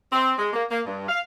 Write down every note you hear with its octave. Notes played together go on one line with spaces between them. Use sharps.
C4
G#3
A#3
A#3
G2
F5